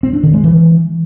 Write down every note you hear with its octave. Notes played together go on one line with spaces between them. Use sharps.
C4
D4
D#3
G#3
E3